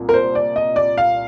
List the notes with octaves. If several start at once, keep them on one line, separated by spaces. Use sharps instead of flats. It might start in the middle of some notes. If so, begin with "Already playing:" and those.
Already playing: C2 A#2
A#4
C5
D5
D#5
D5
F5